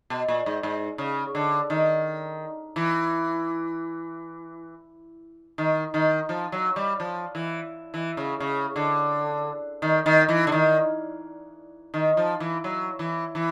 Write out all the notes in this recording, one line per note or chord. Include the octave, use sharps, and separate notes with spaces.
B2
A#2
G#2
G#2
C#3
D3
D#3
E3
D#3
D#3
F3
F#3
G3
F3
E3
E3
C#3
C#3
D3
D#3
D#3
E3
D3
D#3
D#3
F3
E3
F#3
E3
E3